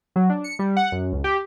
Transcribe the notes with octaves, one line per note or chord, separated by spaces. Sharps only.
F#3
D4
C#7
G3
F#5
F#2
C#2
G4